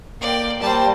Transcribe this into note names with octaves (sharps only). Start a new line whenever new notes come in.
A#3 D#4 F4 A4 D5 G5
G3 A#3 G4 C5 D5 G5 A5